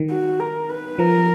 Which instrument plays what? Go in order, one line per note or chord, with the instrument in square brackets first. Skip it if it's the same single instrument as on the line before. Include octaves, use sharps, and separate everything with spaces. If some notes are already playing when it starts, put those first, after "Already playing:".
Already playing: [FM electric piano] D#3
[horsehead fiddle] F#4
A#4
B4
[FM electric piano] F3 [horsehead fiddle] A#4